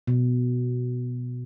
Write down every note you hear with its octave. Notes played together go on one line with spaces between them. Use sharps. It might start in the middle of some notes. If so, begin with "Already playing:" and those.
B2